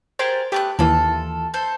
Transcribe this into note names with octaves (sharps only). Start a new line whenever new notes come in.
G4 G#4 A#4 C5 A6
A3 B3 G4 F#6
D#2 E3 F4 A4
A4 C5